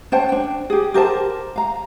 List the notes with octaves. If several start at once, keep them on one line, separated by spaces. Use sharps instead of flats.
C#4 C5 G5 A5
D4 G5
G4 G#4
G4 A#4 C5 A5
F5 A#5